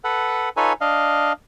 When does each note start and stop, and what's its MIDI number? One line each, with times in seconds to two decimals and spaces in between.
0.04 0.49 69
0.04 0.49 71
0.04 0.49 78
0.57 0.73 63
0.57 0.73 65
0.57 0.73 69
0.57 0.73 71
0.57 0.73 73
0.57 0.73 80
0.81 1.32 62
0.81 1.32 75
0.81 1.32 77